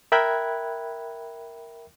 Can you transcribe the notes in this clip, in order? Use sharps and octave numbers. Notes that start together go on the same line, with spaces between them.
A#4 E5 G5 B5 F#6 G#6